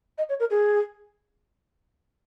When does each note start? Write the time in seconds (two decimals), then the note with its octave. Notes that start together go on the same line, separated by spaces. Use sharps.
0.18 D#5
0.29 C#5
0.40 A#4
0.50 G#4